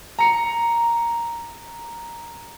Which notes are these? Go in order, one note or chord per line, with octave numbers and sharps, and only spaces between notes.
A#5 C#7